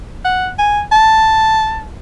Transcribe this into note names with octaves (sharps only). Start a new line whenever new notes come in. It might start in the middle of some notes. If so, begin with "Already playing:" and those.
F#5
G#5
A5